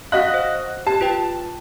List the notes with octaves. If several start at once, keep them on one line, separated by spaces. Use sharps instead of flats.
F#4 D#5 F5 F#6 B6
C5
G4 A5
F4 B4 G5